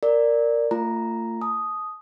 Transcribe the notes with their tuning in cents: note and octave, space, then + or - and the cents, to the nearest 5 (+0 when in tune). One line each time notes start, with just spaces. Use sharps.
A#4 -10 D5 +0
A3 +45 F4 -20 A#5 +0
A5 -35 D#6 +0